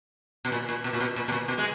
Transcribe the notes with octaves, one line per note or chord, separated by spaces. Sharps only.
B2
A#2
A#2
B2
A#2
B2
A#2
B2
A#2
B2
G#3